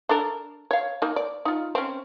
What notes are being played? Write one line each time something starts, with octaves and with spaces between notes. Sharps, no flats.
D4 A4 A#4
C#5 F5
A#3 D#4
D5
D#4 F4
C4 C#4